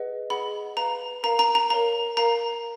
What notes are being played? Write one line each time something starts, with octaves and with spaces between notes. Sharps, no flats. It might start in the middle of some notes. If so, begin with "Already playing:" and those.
Already playing: G#4 B4 D#5 F#5
G#4 D#5 F#5 B5
B4 F5 A#5
A#4 F5 A#5
A#5
A#5
A#4 C#5 F5 A#5
A#4 F5 A#5